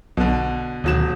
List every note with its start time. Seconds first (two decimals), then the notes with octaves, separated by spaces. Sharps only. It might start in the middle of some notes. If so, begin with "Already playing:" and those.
0.17 B1 B2 D3
0.84 D#1 D2 B2 D#3 F#3 E7